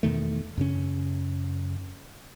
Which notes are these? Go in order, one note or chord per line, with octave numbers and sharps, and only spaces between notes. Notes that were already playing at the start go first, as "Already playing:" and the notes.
E2 B2 D#3 A3
F#2 C#3 C#4